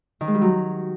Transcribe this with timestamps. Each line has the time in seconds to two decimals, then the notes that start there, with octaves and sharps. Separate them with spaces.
0.21 D#3
0.28 G#3
0.35 G3
0.41 F#3